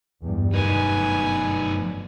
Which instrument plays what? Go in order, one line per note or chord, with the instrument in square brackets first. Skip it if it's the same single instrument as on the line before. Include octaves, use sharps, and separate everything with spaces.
[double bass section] E2 G2 G3
[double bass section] G1 [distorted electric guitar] F#2 D#4 [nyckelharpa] B4 G#5